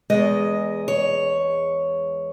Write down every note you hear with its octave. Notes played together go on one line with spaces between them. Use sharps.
E2 B2 G#3 D#5
C#5